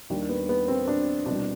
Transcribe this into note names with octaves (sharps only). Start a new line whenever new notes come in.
D#2 D#3 G3 D4
B3
B3
C4
D4
C2 B2 G3 D4